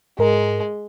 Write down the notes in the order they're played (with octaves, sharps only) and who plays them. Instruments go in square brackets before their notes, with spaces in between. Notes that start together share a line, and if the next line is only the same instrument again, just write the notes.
[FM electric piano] G#2 A#4 [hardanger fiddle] G#3